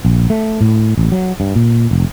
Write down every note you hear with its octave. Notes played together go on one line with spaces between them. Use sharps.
A#1
A3
A2
A1
F#3
G2
A#2
F1